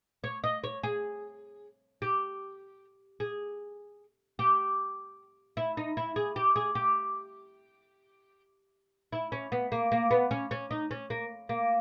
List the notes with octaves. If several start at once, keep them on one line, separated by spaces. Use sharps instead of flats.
C#5
D#5
C#5
G#4
G4
G#4
G4
E4
D#4
E4
G#4
G4
G#4
G4
E4
C#4
B3
A#3
A#3
B3
C#4
C#4
D#4
C#4
A#3
A#3